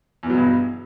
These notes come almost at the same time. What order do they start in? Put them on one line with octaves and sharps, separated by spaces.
E2 E3 F#3 B2 G2